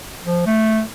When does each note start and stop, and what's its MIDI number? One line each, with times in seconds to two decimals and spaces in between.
0.24 0.43 53
0.46 0.82 57